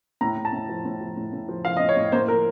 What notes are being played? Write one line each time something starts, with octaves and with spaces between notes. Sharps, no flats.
A2 A#5
A2
A5
A2
F3
A2
F3
A2
A2
F3
F3 F5
D#5
A2
C#5
A2
A#3 C5
F3 A#4